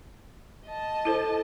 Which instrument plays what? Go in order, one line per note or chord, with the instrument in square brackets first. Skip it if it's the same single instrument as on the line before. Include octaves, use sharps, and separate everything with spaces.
[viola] D#5 A5
[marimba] E4 A4 C5